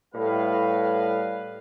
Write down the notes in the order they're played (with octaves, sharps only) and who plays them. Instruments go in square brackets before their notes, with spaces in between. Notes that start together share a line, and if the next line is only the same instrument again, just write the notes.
[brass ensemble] A2 G3 B4 F5